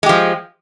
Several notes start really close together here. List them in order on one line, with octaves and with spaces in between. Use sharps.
G#3 G4 F3